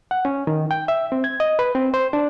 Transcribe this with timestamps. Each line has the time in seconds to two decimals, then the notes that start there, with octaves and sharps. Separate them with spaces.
0.11 F#5
0.25 C#4
0.47 D#3
0.71 G5
0.88 E5
1.12 C4
1.24 G#6
1.40 D#5
1.59 B4
1.75 C4
1.94 C5
2.13 D4